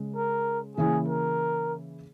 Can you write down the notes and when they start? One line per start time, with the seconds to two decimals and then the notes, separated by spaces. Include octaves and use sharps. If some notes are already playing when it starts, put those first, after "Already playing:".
Already playing: C#3 G#3
0.16 A#4
0.77 C#3 E3 A#3 C#4 E4 G#4
1.08 A#4